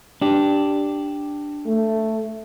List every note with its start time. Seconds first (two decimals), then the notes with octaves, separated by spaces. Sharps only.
0.21 D4 G4
1.66 A3